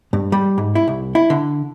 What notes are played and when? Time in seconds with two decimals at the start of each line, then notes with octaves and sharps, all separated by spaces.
0.13 G2
0.32 G3
0.58 G#2
0.75 E4
0.88 C2
1.15 E4
1.30 D3